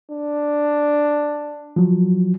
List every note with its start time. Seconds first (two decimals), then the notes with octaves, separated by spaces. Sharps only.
0.12 D4
1.76 F3 F#3